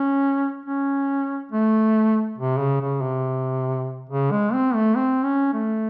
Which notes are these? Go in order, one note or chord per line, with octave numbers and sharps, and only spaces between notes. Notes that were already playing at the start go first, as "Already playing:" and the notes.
Already playing: C#4
C#4
A3
C3
C#3
C#3
C3
C#3
G#3
C4
A3
C4
C#4
A3